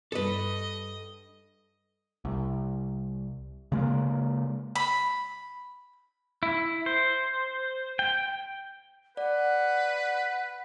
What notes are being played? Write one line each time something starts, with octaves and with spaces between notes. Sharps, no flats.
E2 G2 A4 B4 D#5
C2
C#3 G#3 A#3
B5
E4
C5
G5
B4 D5 F#5